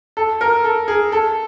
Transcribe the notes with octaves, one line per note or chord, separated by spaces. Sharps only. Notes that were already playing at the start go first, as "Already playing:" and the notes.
A4
A#4
A4
G#4
A4